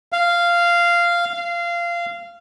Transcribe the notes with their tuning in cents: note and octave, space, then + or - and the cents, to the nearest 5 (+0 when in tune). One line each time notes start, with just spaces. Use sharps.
F5 -10
F5 -20